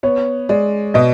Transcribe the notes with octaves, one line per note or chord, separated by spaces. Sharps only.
B3 C#5
G#3 D5
B2 D#5